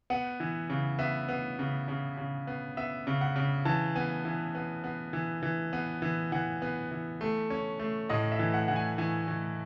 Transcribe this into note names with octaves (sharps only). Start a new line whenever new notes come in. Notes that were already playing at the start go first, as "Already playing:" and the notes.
B3 F#5
E3
C#3
B3 E5
B3
C#3
C#3
C#3
B3
B3 E5
C#3
F#5
C#3
E3 A5
B3 G#5
E3
B3
B3
E3
E3
B3
E3
E3 F#5
B3
E3
A3
C#4
A3
A2 D#5
E5
E3
F#5
E3 F#5
G#5
E3 G#5
E3